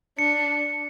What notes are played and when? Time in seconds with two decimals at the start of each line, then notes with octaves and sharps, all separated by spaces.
0.18 D4 C#7